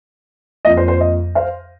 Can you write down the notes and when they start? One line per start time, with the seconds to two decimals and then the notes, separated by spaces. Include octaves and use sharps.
0.65 F2 F3 A#3 D#5
0.77 C5
0.88 C5
1.00 D#5
1.35 C5 F5